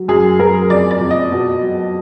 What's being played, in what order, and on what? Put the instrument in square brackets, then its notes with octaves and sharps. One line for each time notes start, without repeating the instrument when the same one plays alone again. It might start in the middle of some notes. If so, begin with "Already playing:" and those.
Already playing: [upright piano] F#3
F#2 G#4
F#2 A#4
F2 D5
D5
F2
D#5
B2
F#3